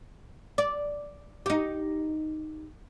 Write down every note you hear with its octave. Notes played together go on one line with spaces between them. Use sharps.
D5
D#4 G4